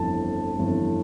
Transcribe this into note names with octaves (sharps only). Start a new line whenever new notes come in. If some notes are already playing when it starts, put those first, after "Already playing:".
Already playing: G1 F2 E3 A5
G1 F2 E3